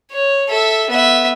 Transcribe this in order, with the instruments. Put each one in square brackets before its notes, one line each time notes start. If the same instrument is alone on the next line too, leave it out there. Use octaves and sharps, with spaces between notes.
[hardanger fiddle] C#5
A4 E5
B3 E5